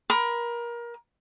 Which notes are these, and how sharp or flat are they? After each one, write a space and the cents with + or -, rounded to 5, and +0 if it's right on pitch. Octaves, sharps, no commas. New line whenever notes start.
A#4 +25 B5 +25